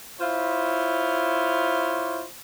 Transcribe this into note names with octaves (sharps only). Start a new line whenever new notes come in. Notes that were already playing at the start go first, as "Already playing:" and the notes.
E4 F4 C5 C#5